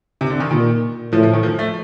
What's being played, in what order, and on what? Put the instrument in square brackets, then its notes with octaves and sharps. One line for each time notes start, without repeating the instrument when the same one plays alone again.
[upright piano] C3
D3
D#3
[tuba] A#2 [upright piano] D#3
[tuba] A2 [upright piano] F3
[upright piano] F3
D#3
F3
A3